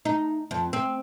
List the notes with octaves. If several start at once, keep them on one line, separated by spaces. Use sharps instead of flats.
D#4
F2
C4